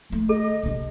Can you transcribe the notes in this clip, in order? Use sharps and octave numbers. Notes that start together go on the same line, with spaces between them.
D#3 A3
A4 D#5
C3 D4